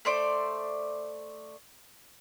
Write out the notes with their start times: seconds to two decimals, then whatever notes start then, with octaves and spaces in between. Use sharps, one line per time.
0.05 A3 C5 D5